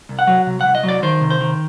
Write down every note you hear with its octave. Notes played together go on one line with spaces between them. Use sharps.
C2
F#5
F#3
C3
C2 F#5
D#5
F#3 D5
D#3 C5
C3
C5
D#3